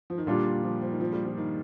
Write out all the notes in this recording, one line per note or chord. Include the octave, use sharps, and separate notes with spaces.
F3
D#3
A#2 D3 G3 D4 F4
F3
F3
D#3
F3
G3
F3
D#3